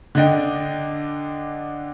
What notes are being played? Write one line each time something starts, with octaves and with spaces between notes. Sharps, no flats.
D3 D4 D#5 G5